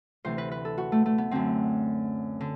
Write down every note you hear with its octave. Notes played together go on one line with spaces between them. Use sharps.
D2 C3 E3 C5
B4
B4
A4
F#4
A3
A3
B3
F#2 D3 C4
D3